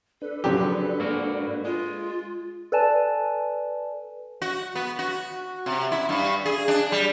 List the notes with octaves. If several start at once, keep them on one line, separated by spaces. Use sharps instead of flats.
D4 A4 B4
C#3 F3 F#3 G4
G#2 A#3 F#4
G#3 F4
A4 B4 D5 G#5 A5
F#4
B3
F#4
C3
E4
G2
G#4
D4
G3